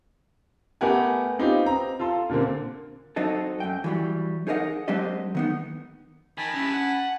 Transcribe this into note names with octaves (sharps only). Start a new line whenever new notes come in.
A3 B3 G4 A#4 F#5 G#5
B3 C4 D#4 F4 G4
C4 A#5
F4 A4 C6
A#2 D3 A#3 C4
F#3 C4 D#4 A4
F#2 G5
E3 F#3 G3
D#4 G#4 A#4 C#5 D#5 F#5
F#3 G#3 C4 D4 G4 D#5
D#3 B3 D#4
D#3 G#5 A5 B5
G2 C#4 E4
F#5